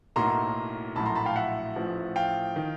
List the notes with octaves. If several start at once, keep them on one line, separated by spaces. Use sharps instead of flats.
B1 A2 F#3 A#3 A#5 C6
A#1 A2 F#3 A3 A5 B5
A#5 C6
A5 B5
F5 G5
E5 F#5
A1 A2 F3
F5 G5
D#3